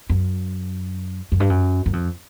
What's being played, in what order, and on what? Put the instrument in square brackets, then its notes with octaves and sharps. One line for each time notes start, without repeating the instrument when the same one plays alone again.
[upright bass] F#2
F#2
G2
F#2
F#2
F2